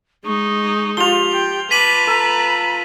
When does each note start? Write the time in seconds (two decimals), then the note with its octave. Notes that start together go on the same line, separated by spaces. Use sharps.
0.25 G#3 D#4 C#6
0.97 F3 F4 G4 F7 G7
1.33 G5
1.71 B4 A5 D6 B6 D#7 F#7
2.07 A4 A#5